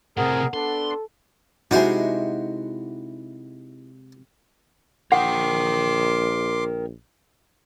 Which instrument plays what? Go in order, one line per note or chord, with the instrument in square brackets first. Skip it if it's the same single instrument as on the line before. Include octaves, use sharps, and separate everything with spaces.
[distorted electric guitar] A2 C3 [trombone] C4 [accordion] G#4 A#4 [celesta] F#5
[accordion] B3 D4 [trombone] A4 [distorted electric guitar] C6
[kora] C3 G#3 [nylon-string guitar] D#4 E4 [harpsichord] F#4 C5
[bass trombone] A#1 [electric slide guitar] A#4 G5 [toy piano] F#5 [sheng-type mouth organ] C6 D6